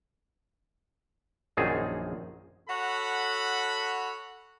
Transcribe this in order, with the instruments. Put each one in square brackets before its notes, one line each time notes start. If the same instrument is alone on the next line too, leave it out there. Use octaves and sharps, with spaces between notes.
[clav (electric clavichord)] A#1 F#2 D#3 D#4 G#4 A5
[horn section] F#4 A4 C#5 F#5 B5